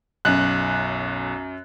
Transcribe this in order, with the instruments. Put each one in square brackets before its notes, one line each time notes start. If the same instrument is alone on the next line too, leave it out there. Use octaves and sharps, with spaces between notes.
[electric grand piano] B1 [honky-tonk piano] F#2 F#6